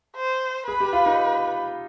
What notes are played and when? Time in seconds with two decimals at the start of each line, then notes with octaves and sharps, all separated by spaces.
0.16 C5
0.67 G#4 B4
0.80 G4
0.93 F4
1.06 D#4